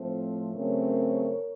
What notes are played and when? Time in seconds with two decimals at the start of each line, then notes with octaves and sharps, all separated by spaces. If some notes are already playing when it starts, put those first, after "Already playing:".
Already playing: A2 F3 A3 C4 A4 C5
0.53 F#2 C#3 A3 C4 A#4 C#5